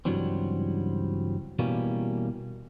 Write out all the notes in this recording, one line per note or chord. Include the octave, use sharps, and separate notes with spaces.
C#2 G2 E3 F#3 G3 C4
B2 E3 G3 A#3 C#4